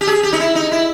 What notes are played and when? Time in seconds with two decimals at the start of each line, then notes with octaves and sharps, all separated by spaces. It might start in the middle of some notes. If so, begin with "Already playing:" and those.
0.01 G4
0.07 G#4
0.23 G4
0.33 D#4
0.40 E4
0.55 D#4
0.72 E4